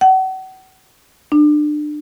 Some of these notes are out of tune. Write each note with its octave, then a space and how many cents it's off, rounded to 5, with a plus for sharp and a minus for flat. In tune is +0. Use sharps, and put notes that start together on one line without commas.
F#5 +35
D4 +30